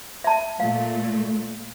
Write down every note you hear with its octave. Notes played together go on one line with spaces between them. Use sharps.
E5 A5
A#2 A3 F5